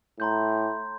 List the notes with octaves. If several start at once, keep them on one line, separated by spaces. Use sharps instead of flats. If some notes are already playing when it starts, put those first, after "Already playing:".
A2 A#5 C6 G6